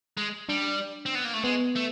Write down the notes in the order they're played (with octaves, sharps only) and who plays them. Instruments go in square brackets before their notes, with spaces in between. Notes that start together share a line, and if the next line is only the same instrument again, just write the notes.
[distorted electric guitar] G#3
[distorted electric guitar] G3 [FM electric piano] D4
[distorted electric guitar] C4
B3
A#3
A3
[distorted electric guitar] G#3 [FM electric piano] B3
[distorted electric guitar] A3